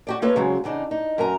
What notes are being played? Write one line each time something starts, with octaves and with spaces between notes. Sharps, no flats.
F#4 G4 D5
A#3 F4 A4 B4 C#5
C#3 F#3 G#3 C4
E2 C#3 D4 D#4
D#4
F#2 A#4 G#5 A#5